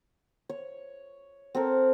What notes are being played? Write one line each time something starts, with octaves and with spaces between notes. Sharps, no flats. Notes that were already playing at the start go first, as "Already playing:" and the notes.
C#5
C4 A4 A#4